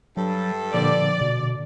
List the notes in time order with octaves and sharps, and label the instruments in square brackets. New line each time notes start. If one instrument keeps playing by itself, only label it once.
[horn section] G2 A4 [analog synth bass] F#3
[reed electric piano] A#2 D3 [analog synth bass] F3 [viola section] D5
[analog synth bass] B2